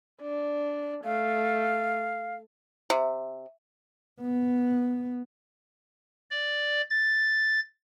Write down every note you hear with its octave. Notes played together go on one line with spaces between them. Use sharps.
D4
A3 F5
C3
B3
D5
A6